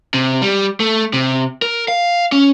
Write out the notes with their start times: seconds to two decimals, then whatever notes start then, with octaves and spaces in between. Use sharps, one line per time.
0.14 C3
0.42 G3
0.80 A3
1.13 C3
1.62 A#4
1.88 F5
2.32 C#4